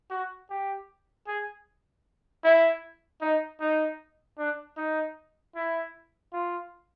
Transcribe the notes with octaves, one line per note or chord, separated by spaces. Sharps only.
F#4
G4
G#4
E4
D#4
D#4
D4
D#4
E4
F4